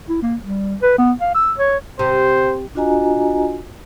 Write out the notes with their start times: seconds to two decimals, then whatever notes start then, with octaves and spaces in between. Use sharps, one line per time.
0.09 E4
0.22 A#3
0.43 G3
0.82 B4
0.98 B3
1.21 F5
1.35 E6
1.58 C#5
1.99 C3 C5
2.75 D4 F4 F#4 D#5 G#5 A#5